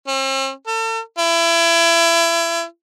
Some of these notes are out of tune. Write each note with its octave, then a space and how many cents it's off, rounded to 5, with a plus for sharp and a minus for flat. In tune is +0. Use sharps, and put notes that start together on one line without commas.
C4 +45
A4 +40
E4 +30